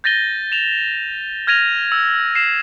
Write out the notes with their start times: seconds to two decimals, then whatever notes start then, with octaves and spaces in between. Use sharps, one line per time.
0.04 G6 A6 A#6 D#7 G7
0.52 E7 F7
1.47 F6 G#6 A#6 D#7 F7
1.92 E6
2.35 C7 E7